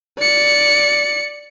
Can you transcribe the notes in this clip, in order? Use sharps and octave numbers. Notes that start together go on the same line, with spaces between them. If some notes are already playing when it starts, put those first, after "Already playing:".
D5 C#7